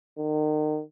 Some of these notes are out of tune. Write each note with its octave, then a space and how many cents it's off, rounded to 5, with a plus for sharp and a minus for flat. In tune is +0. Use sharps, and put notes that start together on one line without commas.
D#3 -30